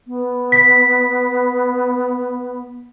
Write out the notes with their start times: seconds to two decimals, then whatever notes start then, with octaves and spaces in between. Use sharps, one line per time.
0.07 B3
0.52 B6